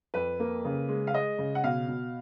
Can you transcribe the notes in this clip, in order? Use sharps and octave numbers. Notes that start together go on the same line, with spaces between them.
F2 B4
A#3
C#3
G#3
F5
G#3 D#5
C#3
F#5
B2 F5
B2